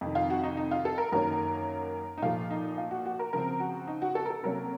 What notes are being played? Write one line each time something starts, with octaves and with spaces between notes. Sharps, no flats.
F2 C3 D#3
F4
F#4
D#4
D#4
F4
A4
A#4
F#2 D#3 F#3 A#3 C#4 A#4
D#4
A#2 F3 A3 F4
D#4
F4
F#4
F#4
A#4
C#3 F3 C4 A#4
F#4
D#4
F#4
A4
A#4
A4
C3 F#3 A#3 C#4 A#4